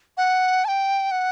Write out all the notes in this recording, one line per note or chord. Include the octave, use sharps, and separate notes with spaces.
F#5
A5
G5
F#5